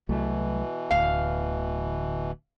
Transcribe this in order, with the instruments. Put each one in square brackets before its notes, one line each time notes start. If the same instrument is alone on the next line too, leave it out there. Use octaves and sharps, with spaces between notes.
[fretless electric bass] C2 F#3 A3 [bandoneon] B2 E3
[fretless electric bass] D1 D2 [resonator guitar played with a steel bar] F5